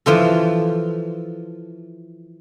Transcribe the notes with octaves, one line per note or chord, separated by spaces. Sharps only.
E3 F3 F4 A4